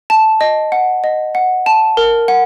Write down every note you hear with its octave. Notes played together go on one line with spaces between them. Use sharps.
A5
D#5
F#5
D#5
F#5
A5
A#4
F#5